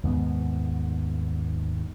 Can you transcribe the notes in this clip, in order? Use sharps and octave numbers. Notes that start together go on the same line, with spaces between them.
D#2 G#2 B3